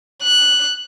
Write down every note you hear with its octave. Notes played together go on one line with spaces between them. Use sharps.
F#6